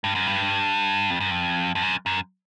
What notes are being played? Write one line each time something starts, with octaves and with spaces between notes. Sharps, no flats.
G2
F#2
G2
F2
F#2
F2
F2
F#2
F#2